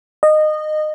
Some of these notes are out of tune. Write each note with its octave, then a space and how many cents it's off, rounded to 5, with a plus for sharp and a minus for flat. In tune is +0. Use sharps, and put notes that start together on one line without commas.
D#5 -20